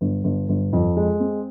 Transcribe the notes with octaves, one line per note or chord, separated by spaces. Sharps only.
G1
G1
G1
F2
G#3
C4